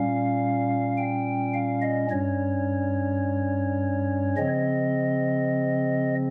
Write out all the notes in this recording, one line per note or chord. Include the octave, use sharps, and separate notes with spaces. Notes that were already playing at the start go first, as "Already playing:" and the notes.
Already playing: A#2 G3 C#4 F5
G5
F5
D#5
G2 G3 C#4 C#5
C#3 F3 C4 D#5